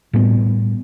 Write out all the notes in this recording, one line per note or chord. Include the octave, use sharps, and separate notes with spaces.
A2 G3 B3